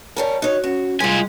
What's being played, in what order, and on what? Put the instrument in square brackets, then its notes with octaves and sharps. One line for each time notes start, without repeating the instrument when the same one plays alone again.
[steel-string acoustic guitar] G3 C#4 A#4 [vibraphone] A5
[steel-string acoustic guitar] D#4 C#5 [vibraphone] F#4
[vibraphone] C#4 [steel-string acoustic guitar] F#4
[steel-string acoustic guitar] G#2 G#3 [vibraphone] G3 [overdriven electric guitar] F4 G#5